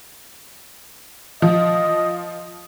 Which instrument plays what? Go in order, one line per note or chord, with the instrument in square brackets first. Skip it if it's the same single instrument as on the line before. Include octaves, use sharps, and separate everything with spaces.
[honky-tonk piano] F3 [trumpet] D#5